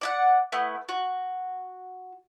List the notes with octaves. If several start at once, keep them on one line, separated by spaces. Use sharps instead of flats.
D5 E5 F#5
A3 B3 E4
F#4